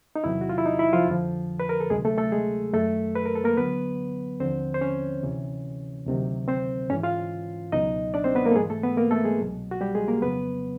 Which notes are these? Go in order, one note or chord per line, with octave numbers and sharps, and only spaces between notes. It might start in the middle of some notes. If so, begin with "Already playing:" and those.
D#4
E2 C3 D#3 F#3 E4
F#4
F4
E4
D#4
E4
F3 F4
F2 D3 F3
B4
A#4
A4
D2 C3 D#3 F#3 G#3 G#4
A3 A4
A3 A4
G#3 G#4
F#2 D#3 F#3 A3 A4
B4
A#4
A4
A#3 A#4
D2 D3 F#3 B3 B4
D#2 D3 F3 C4 C5
C5
C#4 C#5
D2 C3 E3
D2 C3 D#3 F#3
C4 C5
G#2 E3 C#4 C#5
F4 F5
C#2 B2 F#3 D#4 D#5
D4 D5
C4 C5
B3 B4
A#3 A#4
A4
G#2 E3 G#3 G#4
A3 A4
B3 B4
A#3 A#4
A3 A4
G#3 G#4
C2 B2 F#3
F#4
G3 G4
G#3 G#4
A#3 A#4
F2 C#3 F#3 B3 B4